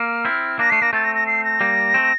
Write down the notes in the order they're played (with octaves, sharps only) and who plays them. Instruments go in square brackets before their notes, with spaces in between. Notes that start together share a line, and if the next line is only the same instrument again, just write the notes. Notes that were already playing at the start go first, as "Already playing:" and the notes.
Already playing: [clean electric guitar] A#3 [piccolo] F6
[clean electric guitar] C4 E4
[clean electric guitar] A#3 D4 [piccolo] A#6
[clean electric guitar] A3 [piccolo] C7
[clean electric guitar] A#3 [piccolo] A#6
[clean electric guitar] A3 C4 [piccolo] A6
[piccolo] A#6
A#6
C7
A#6
[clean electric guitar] G3 A#3
A3 C4